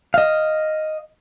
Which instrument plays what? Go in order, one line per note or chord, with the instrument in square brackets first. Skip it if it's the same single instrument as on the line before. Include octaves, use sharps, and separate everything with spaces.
[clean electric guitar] D#5 F5